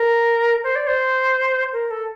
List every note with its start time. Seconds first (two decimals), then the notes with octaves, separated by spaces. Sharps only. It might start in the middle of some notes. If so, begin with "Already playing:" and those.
Already playing: A#4
0.64 C5
0.75 D5
0.87 C5
1.73 A#4
1.91 A4